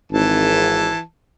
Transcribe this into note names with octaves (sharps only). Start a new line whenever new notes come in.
G#1 E3 A5